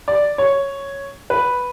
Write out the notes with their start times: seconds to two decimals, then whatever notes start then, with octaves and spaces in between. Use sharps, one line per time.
0.08 D5
0.38 C#5
1.30 B4